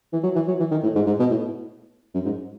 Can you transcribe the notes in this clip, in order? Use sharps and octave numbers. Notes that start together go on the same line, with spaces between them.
E3
F#3
E3
F#3
E3
D#3
A2
G#2
G#2
B2
A2
F#2
G#2